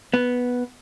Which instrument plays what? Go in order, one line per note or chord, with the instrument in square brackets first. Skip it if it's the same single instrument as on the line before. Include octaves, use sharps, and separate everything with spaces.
[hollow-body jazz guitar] B3